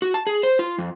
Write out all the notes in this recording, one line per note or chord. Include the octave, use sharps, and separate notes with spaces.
F#4
A5
G#4
C5
F4
F2